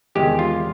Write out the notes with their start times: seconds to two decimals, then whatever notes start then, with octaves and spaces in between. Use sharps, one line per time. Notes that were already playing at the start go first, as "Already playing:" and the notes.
0.15 E2 C3 D#3 G#3 G4
0.39 F4